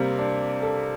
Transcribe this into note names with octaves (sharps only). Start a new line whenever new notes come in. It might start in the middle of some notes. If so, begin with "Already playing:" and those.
Already playing: C3 G3 A#3 C4
D4
A4